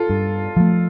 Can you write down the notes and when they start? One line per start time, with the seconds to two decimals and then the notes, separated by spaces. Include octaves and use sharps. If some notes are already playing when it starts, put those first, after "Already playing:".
Already playing: F4 A4
0.10 G2
0.57 F3 A3